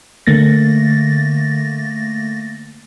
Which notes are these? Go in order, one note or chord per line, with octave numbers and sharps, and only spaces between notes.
D3 A3 A#3 A6 A#6